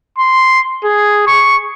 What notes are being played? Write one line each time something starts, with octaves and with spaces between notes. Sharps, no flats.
C6
G#4
C#6